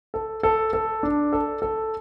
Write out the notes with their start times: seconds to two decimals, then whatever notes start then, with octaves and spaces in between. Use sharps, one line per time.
0.14 A4
0.43 A4
0.73 A4
1.03 D4
1.33 A4
1.62 A4